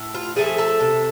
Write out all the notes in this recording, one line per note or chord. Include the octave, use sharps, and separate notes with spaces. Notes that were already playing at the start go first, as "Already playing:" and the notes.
Already playing: A2
F4 F5
F3 A3 C4 G#4 G#5
A4 A5
C3